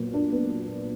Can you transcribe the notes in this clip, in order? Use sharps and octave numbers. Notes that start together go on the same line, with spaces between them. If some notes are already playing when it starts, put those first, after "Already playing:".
Already playing: A#2 F#3 B3
D4
B3